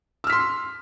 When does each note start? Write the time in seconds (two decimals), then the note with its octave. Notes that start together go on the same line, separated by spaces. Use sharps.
0.24 E6
0.27 F6
0.30 B6
0.32 C6